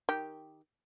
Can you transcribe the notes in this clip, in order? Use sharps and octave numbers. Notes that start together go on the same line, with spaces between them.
D#3 G4